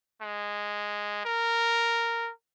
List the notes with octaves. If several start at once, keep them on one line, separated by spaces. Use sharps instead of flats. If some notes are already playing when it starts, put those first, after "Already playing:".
G#3
A#4